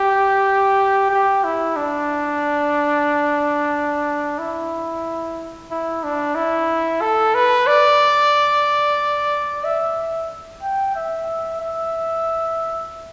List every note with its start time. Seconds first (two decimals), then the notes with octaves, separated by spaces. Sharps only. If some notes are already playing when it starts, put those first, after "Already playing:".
Already playing: G4
1.10 G4
1.44 E4
1.76 D4
4.39 E4
5.71 E4
6.04 D4
6.35 E4
7.01 A4
7.35 B4
7.67 D5
9.64 E5
10.62 G5
10.96 E5
11.61 E5